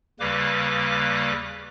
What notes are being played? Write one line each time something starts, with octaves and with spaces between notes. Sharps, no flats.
D#2 C#3 G3 A#3 B4 D6